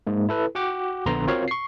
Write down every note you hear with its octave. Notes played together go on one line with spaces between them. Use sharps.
G#2 G#3 A#3
E4 A4 B4
F#4 F#5 G5 D6
A#1 D3 B3 A#5 C6
C4 F4 F#4 A#4 C#5 F5
C#6 C7